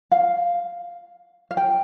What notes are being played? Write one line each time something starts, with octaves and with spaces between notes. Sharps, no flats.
F5
F5
G5